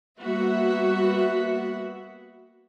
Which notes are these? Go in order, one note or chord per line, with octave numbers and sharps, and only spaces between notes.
G3 A#3 B3 F#4 E5 F#5